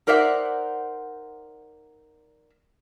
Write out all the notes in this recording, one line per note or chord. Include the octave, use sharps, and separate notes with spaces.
D#4 A#4 C5 D5 E5 F#5